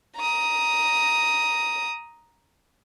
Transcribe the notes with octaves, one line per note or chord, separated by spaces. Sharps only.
A#5 D#6